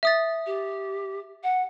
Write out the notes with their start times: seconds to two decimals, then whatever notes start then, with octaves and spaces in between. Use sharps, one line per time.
0.03 E5 D#6 A6
0.46 G4
1.43 F#5